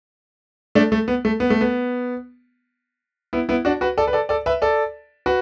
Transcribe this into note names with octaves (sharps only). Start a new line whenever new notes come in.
A3 D4
A3
B3
A3
B3
A3
B3
B3 E4
B3 E4
D4 F#4
F#4 B4
A4 D5
B4
A4 D5
A4 D5
B4 E5
A4 D5
F#4 B4